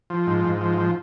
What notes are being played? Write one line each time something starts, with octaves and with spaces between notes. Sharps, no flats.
F3
G#2
G#2
F3
F3